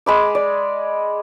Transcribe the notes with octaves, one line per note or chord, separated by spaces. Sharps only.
G#3 B5 D6
D5